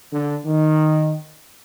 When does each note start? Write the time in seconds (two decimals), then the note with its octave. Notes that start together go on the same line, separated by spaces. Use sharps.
0.12 D3
0.45 D#3